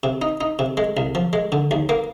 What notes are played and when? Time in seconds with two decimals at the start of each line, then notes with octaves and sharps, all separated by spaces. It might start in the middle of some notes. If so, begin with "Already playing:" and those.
0.03 C3
0.22 D#4
0.41 D#4
0.59 C3
0.77 G#3
0.97 C2
1.15 F3
1.33 G#3
1.52 D3
1.71 D#2
1.89 A#3